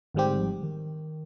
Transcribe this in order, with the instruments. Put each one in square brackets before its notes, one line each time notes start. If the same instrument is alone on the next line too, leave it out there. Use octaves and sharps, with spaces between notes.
[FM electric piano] G#1 G#2 G3 C4 G4 [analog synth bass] D#3
[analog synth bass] D3
F3
D#3